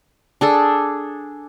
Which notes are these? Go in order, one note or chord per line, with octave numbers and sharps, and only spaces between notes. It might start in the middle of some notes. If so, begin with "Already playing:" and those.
D4 G#4 A4